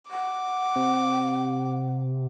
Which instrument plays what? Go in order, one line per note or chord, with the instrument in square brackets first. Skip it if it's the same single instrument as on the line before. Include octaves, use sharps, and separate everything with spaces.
[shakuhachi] F#5 [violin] D6
[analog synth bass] C3